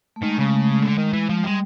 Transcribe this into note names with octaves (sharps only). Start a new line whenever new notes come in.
A3
D#3 G#3
C#3 G#3
A3
G#3
D3
D#3
E3
F3
G3 G#3